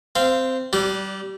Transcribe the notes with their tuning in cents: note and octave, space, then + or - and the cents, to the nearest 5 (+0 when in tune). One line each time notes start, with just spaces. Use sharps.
C4 -10 F5 -20
G3 -25 D4 +0